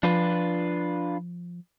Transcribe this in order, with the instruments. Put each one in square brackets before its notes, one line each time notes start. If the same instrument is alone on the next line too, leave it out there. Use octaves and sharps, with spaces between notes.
[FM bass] F3 [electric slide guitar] D4 F4 B4